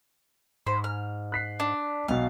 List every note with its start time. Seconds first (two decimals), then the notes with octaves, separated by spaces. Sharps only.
0.67 G#2 C5 B5
0.84 F6
1.32 F#6 B6 C7
1.60 D4
2.08 B1 B2 F5